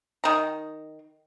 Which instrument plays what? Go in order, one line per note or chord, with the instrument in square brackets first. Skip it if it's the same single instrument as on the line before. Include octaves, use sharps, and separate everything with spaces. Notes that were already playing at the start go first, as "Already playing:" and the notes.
[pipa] D#3 A#5